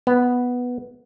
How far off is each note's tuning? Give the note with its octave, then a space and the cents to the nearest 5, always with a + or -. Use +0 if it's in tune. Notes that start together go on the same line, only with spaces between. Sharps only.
B3 -5